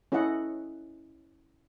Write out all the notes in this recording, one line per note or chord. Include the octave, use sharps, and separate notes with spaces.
C#4 E4 A4 D#5 F#5